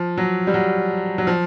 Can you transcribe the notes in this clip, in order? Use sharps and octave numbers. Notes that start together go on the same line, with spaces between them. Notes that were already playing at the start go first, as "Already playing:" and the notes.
Already playing: F3
F#3
G3
F#3
F#3
F3